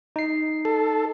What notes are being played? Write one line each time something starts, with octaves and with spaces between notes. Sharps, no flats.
D#4 C7
A4